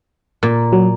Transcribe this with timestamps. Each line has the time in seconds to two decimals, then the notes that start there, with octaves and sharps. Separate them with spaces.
0.43 A#2
0.73 F#3